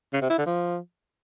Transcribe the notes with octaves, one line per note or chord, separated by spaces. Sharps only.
C#3
C3
E4
D3
F3